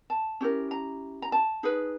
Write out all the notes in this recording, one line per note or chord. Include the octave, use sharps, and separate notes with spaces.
A5
C#4 E4 G4 A#4
A#5
A#5
A5
D#4 G#4 B4